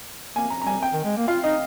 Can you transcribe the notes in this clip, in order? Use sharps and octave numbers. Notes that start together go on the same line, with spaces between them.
A#3 G#5
A#5
A#5
G3 G#5
G5
D#3
G#3
A#3
F4 F5
D#4 D#5